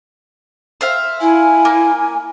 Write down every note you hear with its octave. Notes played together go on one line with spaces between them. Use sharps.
C5 E5 F5
E4 G#5
A#3